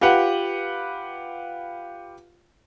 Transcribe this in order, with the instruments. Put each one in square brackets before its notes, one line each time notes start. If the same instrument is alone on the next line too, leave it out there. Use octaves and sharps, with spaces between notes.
[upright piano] F4 G4 B4 F#5